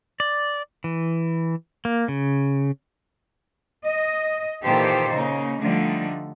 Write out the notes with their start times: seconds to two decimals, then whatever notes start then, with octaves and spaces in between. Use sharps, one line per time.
0.20 D5
0.84 E3
1.85 A#3
2.08 C#3
3.85 D#5
4.63 A#2 D#3 E3 G4 A4 C5
5.13 C#3 A#3 D#4
5.59 D3 F3 G3 A3 D#4